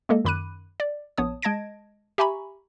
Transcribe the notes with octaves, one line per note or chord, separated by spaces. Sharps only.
G#3 A#3 A4 D#5
F#2 D#3 B5 D6 F#6 D#7
D5
A#1 B3 C#5 A5 D#6
G#3 D#5 A5 G#6 A#6 D7
G4 E5 G#5 A#5 B5 C#6